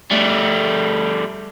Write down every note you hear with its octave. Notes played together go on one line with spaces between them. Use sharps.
G3 A3